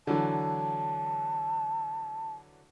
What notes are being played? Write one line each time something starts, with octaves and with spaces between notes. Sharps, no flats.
D3 E3 F#3 A5